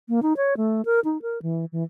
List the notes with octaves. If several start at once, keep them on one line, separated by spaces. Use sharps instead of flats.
A#3
D#4
C#5
A3
A#4
D#4
A#4
E3
E3